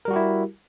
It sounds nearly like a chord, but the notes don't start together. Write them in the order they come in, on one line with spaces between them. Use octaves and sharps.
A#4 G3 F#4 G4 E4